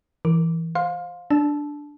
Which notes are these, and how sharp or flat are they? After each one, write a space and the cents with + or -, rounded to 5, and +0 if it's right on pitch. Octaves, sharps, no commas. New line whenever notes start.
E3 +0 A#4 +0 D6 -10
C5 +0 F5 +20 C6 +0
D4 +0 A5 -20 E6 +0